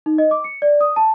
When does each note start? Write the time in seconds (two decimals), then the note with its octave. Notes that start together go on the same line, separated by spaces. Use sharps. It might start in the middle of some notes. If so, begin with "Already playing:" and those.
0.06 D#4
0.18 D#5
0.31 D6
0.44 C#7
0.62 D5
0.81 D#6
0.96 A5